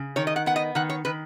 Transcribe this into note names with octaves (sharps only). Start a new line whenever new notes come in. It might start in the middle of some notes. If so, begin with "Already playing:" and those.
Already playing: C#3
D#3 C#5
D#5
F#5
B3 F#5
D#5
D#3 F#5
C#5
D#3 B4